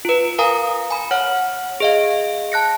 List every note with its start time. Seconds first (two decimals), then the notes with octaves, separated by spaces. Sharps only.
0.05 F4 B4
0.39 A#4 F5 G#5 A#5 D#6
0.91 G#5 B5
1.11 C#5 F#5 F6
1.80 G#4 D#5 F5
2.52 A5 F#6 A#6 C#7